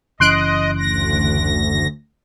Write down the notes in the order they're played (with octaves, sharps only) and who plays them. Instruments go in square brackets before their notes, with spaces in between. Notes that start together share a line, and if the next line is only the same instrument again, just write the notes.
[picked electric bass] F#1 E3 C#4 [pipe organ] D#5 [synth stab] C6 F#6 D7
[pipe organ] D2 A#6